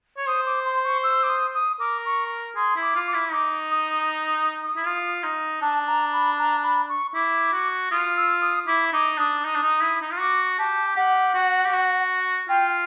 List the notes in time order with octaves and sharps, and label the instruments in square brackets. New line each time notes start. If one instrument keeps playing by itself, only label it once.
[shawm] C#5
[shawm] C5 [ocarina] D#6
[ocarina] D6
C6
C#6
E6
D6
D#6
D#6
[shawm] A#4 [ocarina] D6
[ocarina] C#6
[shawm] G#4 [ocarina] C6
[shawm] E4
[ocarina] D6
[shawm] F4
[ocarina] D6
[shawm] E4
[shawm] D#4 [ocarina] D6
[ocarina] D#6
D#6
[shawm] E4
F4
D#4
[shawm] D4 [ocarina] A5
[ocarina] A#5
B5
A#5
B5
C#6
[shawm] E4 [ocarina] D6
[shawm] F#4
[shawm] F4 [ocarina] D#6
[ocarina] E6
D#6
[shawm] E4 [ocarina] D6
[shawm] D#4 [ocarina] D6
[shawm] D4 [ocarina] D#6
[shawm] D#4 [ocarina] D#6
[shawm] D4
D#4
E4
D#4
F4
[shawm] F#4 [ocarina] D6
[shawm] G4 [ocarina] A5
[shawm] G4 [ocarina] F#5
[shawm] F#4
G4
F#4
[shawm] F4 [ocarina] G5